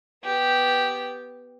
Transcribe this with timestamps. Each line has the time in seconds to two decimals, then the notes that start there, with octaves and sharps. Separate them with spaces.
0.24 B3 G4